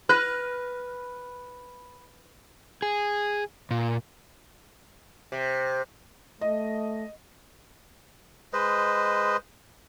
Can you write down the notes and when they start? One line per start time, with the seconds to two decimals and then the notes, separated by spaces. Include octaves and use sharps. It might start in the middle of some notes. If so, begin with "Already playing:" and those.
0.09 B4 F6 F#6 A#6
2.82 G#4
3.71 A#2
5.32 C3
6.41 A3 D#5
8.53 G#3 B4 C5 D#5